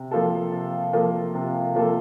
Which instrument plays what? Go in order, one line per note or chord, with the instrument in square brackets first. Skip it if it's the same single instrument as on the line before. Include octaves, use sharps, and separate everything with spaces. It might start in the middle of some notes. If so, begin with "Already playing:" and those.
Already playing: [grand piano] C3
F3 A#3 F4 A4
C3
F3 A#3 F4 A4
C3
F3 A#3 F4 A4